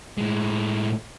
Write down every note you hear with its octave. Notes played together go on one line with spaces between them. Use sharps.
A2 G#3